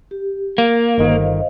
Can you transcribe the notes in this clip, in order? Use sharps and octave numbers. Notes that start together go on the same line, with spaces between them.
G4
A#3 F5
G1 D#3 C5 D#5 F5